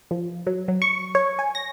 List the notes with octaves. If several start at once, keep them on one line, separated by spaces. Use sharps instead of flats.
F3
F#3
F#3
C#6
C#5
G#5
A#6